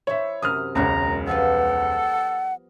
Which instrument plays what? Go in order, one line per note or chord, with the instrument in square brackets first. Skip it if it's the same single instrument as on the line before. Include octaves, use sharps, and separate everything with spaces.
[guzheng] E4 C5 [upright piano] C#5 E5
[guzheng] F#2 C3 [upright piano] D#6 F6
[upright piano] E1 C#2 [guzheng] F#3 F#4 A#4 [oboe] A#5
[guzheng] F3 G3 B3 [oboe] A4 [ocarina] F#5